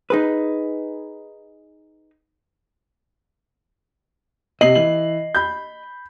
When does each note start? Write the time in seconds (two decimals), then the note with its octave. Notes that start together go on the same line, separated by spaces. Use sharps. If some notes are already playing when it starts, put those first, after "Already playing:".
0.10 D#4 G#4 B4
4.61 C3 D#5 C7 F#7
4.75 E3 F#7
5.35 B5 G6